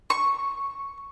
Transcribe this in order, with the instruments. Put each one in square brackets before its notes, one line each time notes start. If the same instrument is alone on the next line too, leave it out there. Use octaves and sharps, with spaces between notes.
[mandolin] C#6